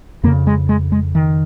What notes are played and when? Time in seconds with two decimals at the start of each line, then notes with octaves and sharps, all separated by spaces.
0.24 F2 A#3
0.27 C#3
0.47 G#3
0.69 G#3
0.92 G#3
1.15 D#3